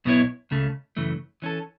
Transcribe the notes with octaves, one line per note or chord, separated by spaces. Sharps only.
B1 B2 B3 E4 C#5
C#2 C#3 A3
F#2 C#3 E3 A3
E3 C#4 A4